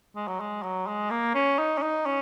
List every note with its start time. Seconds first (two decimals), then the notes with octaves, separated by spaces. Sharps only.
0.16 G#3
0.27 F#3
0.40 G#3
0.63 F#3
0.87 G#3
1.11 A#3
1.35 C#4
1.59 D#4
1.78 C#4
1.83 D#4
2.06 C#4